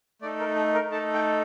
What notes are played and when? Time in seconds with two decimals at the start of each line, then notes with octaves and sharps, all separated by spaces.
0.22 A3 D#4 A4 D5
0.39 A#4
0.56 A4
0.74 A#4
0.90 A3 D#4 A4 A5
1.14 G5